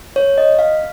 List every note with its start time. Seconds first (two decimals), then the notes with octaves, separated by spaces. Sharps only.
0.16 C#5
0.38 D#5
0.59 F5